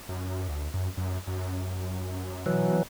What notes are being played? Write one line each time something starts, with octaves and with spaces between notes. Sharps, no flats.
F#2
D2
F#2
F#2
F#2
B2 E3 F#3